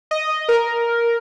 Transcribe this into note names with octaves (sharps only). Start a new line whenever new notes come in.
D#5
A#4